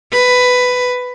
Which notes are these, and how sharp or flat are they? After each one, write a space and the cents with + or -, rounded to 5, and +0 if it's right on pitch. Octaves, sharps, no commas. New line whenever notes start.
B4 +10